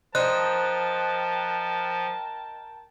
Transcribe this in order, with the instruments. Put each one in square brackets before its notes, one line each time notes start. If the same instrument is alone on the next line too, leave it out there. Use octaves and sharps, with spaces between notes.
[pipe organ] F3 [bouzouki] D#4 C5 [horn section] A#4 G5 A5 [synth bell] F#6